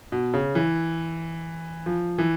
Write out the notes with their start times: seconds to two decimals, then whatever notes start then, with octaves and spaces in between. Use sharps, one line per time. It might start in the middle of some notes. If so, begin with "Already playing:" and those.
0.12 B2
0.34 C#3
0.55 E3
1.86 F3
2.18 E3